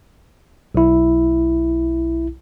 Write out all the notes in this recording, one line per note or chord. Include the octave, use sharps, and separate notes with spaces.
B1 E4